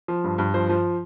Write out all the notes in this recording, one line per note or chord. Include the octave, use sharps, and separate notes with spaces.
F3
G2
G2
F3 C5
F3